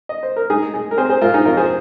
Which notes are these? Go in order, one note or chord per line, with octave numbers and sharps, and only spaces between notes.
D#5
C5
A#4
G#3 D#4 G#4
G#3
A#4
C4 G#4 C5
G#4 C5
G#2 F4 A#4
D#4 G#4
F2 F4 A#4
G#4 C5